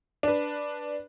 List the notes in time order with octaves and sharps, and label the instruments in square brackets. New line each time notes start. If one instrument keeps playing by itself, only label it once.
[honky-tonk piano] D4 B4